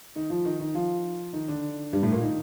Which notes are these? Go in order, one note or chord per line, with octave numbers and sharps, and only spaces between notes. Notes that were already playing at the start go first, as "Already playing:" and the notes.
D#3 D#4
F3 F4
D#3 D#4
D#3 D#4
F3 F4
D#3 D#4
D3 D4
G2 G3
A2 A3
A#2 A#3
D#3 D#4